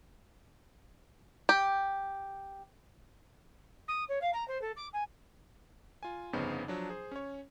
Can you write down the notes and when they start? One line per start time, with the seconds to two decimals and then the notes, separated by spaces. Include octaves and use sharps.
1.49 G4
3.88 D#6
4.09 C#5
4.21 F5
4.33 A#5
4.48 C5
4.61 A4
4.76 D6
4.93 G#5
6.03 F4 G#5
6.33 G1 F2 C#3 B3 D#4 C5
6.68 F3 F#3 D4
6.89 G#4 C5
7.11 C#4 C#5